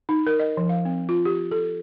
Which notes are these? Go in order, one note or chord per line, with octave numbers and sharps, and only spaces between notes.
D#4
A#4
D#5
F3
F5
C4
F4
G4
A4